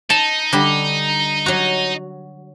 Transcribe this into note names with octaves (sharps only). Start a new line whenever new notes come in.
D#4 A5
D3 G3
F#3 F#4